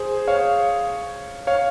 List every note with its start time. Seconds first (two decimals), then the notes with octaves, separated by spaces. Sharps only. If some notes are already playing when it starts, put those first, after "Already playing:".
Already playing: G#4 C5
0.28 C#5 F5
1.47 C#5 F5